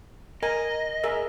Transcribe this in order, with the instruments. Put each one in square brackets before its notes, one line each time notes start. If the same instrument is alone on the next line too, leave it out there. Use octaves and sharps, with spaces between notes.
[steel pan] A#4 G#5 [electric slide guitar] D#5
[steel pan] G#4 A#4 E5